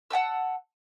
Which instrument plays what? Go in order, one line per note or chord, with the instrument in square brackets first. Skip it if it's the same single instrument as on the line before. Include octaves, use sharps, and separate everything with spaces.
[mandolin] F#5 G5 A5 E6